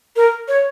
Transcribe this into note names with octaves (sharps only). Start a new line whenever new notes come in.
A#4
C#5